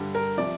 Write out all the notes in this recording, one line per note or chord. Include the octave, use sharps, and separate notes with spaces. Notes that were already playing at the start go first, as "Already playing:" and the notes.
Already playing: G2 D3 G3
A#4
C3 F3 D5